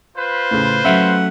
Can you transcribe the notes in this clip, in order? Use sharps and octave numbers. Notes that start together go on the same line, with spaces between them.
F4 B4 C5
A2 C#3
F#3 A3 C#4 E5 F#5